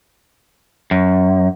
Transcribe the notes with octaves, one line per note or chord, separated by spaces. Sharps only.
F#2